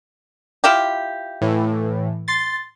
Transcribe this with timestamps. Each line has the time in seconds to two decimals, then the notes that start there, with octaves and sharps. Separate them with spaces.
0.64 E4 F4 G4
1.42 A2 E3
2.28 C6 A6